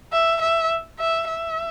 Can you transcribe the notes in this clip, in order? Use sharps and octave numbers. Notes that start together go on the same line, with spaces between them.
E5
E5
E5
E5